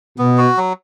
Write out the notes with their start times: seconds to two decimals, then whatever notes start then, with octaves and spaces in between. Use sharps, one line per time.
0.18 B2 B3
0.38 F#4
0.57 F#3